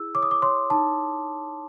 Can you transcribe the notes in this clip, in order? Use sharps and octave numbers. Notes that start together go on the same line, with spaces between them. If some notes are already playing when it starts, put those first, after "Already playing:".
Already playing: E4 G#4 E6
C#5 D6
D#6
D6
C#5 C6
D#4 A5